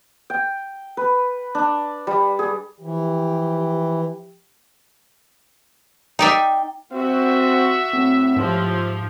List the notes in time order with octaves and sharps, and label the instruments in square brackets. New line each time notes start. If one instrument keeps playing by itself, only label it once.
[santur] G5
B4
D4
G3
G#4
[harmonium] E3 [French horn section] F3 G4
[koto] D#4 D5 E5 [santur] G5
[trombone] C4 [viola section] F#4 [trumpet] E5
[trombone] A2 [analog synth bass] C4
[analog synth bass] G#2 [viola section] F3 G4